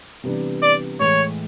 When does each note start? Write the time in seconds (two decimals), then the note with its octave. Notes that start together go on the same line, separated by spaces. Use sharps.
0.23 C3 E3 G3 B3 D4
0.62 D5
1.00 A2 E3 G#3 C#5